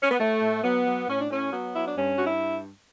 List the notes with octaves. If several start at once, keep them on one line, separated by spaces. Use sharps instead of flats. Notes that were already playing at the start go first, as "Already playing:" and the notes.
C#4
B3
A2 A3
A2
F#3 B3
F#3
A2 C#4
D4
A2 C#4
F#3 B3
F#3 E4
D4
G2 C#4
G2 F#4
E4